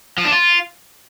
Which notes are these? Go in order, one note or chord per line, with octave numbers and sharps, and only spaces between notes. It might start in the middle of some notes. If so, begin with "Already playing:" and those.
F3
D4
F4